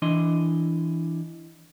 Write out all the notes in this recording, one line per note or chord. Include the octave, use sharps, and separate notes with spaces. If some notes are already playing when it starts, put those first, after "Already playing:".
E3 D4 E4 D#5 C6